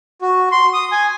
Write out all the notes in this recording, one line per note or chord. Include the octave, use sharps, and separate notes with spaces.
F#4
C6
D#6
G#5